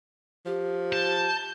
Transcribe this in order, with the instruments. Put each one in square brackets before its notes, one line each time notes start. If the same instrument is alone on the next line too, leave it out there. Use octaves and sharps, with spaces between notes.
[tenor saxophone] F3 [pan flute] G4
[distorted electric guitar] A5 [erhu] G6